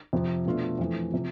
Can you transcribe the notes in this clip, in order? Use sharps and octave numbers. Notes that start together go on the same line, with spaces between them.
F2 C3 F3
B2 A3 D4 F4
F2 E3 A3
C3 F3